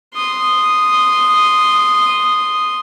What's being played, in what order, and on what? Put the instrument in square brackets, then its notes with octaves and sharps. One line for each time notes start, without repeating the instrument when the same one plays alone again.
[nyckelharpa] C6 D#6